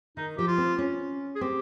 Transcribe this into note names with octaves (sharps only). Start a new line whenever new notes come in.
D#3 D#4
F3 G4
F4
C4
C#4
G#4
C4 G4